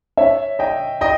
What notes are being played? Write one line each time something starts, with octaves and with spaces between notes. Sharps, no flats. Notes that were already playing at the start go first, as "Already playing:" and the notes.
C#5 E5
D#5 G5
D#5 G5